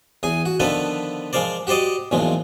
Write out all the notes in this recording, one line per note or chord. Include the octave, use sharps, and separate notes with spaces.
E2 G#4 G#5
F#4
D3 D#3 F3 B3 A4 B4
F3 G#3 A#4 C5 D5
F#4 G4 C5 D5 D#5
B1 E2 A#2 F3 G#3